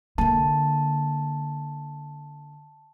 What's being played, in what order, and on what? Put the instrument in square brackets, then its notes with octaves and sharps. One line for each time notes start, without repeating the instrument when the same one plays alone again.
[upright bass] D3 A#3 [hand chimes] A5